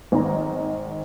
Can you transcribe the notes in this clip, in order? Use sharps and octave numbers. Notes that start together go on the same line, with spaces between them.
G#1 D#3 D#4 A#5